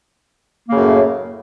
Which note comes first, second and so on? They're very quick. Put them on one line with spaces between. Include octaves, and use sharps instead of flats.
A#3 C#3 F#2 A2